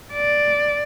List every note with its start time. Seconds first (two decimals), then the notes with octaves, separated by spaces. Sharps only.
0.13 D5